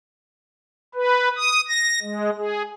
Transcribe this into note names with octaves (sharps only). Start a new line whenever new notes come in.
B4
D#6
A#6
G#3
G#4